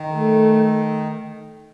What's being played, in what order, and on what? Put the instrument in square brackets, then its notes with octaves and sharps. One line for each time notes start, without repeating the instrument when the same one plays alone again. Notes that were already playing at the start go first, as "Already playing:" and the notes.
Already playing: [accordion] D#3
[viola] A3